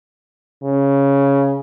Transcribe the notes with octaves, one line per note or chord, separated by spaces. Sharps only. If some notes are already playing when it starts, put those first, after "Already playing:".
C#3